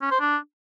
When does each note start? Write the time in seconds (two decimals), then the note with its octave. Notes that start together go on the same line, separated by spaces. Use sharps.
0.02 C#4
0.11 C5
0.20 D4